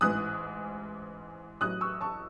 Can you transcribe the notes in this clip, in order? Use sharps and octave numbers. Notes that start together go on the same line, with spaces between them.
A1 G#2 E3 D#6 F#6
A1 A2 F#3 D#6 F#6
C#6 E6
A5 C#6